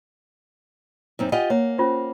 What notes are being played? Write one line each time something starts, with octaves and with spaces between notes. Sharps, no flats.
F#2 C4 D#4
F4 G4 D#5 F#5 G#5
A#3 C#5
C#4 F4 C5